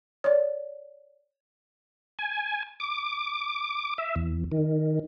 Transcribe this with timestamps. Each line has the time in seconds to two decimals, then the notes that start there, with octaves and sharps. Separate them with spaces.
0.24 C#5 D5
2.19 G#5
2.80 D6
3.98 E5
4.16 E2
4.52 D#3